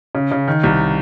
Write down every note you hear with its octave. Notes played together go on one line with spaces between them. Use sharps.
C#3
C#3
D#3
C2